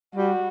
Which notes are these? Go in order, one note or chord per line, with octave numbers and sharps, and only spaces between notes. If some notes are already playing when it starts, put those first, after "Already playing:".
G3 F#4